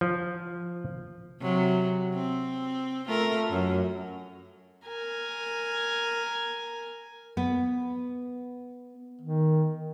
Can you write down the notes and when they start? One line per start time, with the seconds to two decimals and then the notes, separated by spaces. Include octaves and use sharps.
0.01 F3
1.41 C3 F#3
2.15 C4
3.07 A3 F4 A#4
3.50 F#2
4.87 A#4 G#5
7.37 B3
9.21 D#3